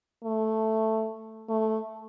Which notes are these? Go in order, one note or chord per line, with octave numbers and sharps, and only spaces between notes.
A3
A3